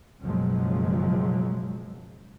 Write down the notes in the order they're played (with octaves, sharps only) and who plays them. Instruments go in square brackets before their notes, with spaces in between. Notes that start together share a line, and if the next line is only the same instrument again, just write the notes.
[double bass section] F#1 B2 F3 F#3 G#3